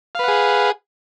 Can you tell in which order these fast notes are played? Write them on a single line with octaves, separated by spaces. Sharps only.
F5 B4 F#5 G#4